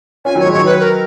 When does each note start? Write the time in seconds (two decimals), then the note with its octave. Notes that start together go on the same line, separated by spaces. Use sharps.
0.25 C#4 F4 G#5
0.35 D#3 F#3 C#5
0.45 F3 G#3
0.53 D#3 F#3 C#5
0.66 B4
0.80 A#4